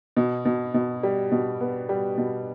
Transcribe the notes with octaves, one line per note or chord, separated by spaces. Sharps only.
B2
B2
B2
G3
B2
B3
G3
B2